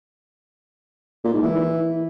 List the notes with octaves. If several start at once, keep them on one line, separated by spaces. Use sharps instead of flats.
A#2
G#2
E3